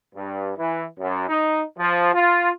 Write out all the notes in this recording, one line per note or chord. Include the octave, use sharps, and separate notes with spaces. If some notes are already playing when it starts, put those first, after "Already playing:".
G2
E3
F#2
D#4
F3
F4